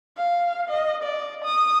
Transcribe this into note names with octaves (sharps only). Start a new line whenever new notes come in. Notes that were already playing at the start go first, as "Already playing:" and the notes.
F5
D#5
D5
D#6